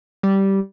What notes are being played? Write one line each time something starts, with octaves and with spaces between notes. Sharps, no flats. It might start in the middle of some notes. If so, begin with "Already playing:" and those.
G3